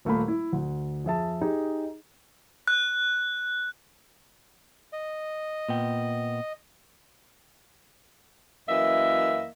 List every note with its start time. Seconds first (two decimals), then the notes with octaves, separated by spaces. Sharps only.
0.05 D#1 A3 A#3 A#4 B5
0.28 E4
0.53 D2
1.05 F2 G#4 E5 A5
1.41 D#4 G4 G#4
2.68 F#6
4.93 D#5
5.69 A#2 B3 G5
8.68 F#2 E3 A#3 D#5 E5